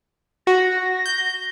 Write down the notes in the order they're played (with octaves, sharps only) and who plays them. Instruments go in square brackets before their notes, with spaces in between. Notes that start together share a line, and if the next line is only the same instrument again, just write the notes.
[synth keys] F#4 [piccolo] A#6
[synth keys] G6